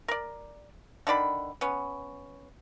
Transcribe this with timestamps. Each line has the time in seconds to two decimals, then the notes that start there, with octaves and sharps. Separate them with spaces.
0.08 A#4 D5
1.07 D3 D#3 D5 B5
1.61 B3 C#4